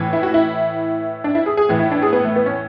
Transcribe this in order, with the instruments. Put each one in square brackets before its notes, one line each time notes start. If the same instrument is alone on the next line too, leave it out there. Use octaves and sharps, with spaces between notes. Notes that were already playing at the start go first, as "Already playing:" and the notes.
Already playing: [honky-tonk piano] A2 E3
E4
F#4
E4
D4
E4
G#4
G#4
A2 E3
E4
D4
G#4
B3
A3
B3
C#4